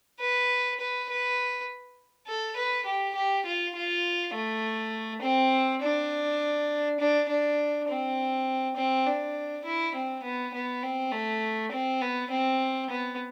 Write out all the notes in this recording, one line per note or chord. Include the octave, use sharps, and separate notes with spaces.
B4
B4
B4
A4
B4
G4
G4
F4
F4
A3
C4
D4
D4
D4
C4
C4
D4
E4
C4
B3
B3
C4
A3
C4
B3
C4
B3